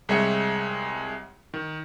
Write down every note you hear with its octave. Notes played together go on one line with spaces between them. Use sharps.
C2 G#3 C#5 E5 G5 C#7
D#3